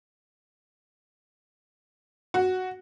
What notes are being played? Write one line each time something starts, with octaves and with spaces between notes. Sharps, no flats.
F#4